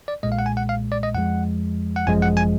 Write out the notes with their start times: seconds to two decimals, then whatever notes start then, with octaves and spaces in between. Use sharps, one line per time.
0.08 D5
0.23 B1 A#2 G#3 D#5
0.32 F5
0.39 F#5
0.46 G#5
0.57 F#5
0.69 F5
0.92 D5
1.03 D#5
1.15 F2 F3 G#3 F#5
1.96 F#5
2.06 G#1 F#2 F3 G#3 G#5
2.22 F#5
2.37 G#5